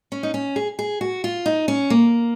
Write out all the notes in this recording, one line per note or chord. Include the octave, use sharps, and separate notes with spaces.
C#4
D#4
C#4
G#4
G#4
F#4
F4
D#4
C#4
A#3